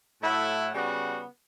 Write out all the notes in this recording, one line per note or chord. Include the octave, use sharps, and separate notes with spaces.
A2 F#3 A3 E4
C#3 G3 B3 F#4